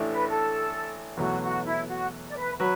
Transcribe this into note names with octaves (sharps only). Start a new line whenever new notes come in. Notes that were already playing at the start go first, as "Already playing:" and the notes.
Already playing: A1 A2 A3 D4
B4
A4
E2 B2 F#3 A3 F#4
F#4
E4
F#4
D5
B4
F#3 F#4 B4